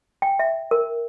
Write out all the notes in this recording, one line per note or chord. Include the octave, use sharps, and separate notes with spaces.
G5
E5
A#4